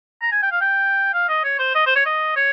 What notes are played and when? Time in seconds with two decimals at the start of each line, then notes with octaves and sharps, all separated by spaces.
0.22 A#5
0.32 G#5
0.43 G5
0.52 F5
0.61 G5
1.14 F5
1.29 D#5
1.44 C#5
1.59 C5
1.75 D#5
1.87 C5
1.96 C#5
2.06 D#5
2.37 C#5